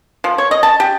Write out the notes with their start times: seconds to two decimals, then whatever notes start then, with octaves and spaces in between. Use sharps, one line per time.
0.24 F3
0.38 C#5
0.51 D#5
0.63 A5
0.80 G4